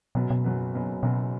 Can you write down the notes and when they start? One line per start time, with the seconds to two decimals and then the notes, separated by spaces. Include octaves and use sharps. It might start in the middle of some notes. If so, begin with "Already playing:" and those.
0.15 F#1 F#2 B2 F#3 B3
0.30 B2
0.44 F#1 F#2 F#3 B3
0.74 F#1 F#2 F#3 B3
1.03 F#1 F#2 B2 F#3 B3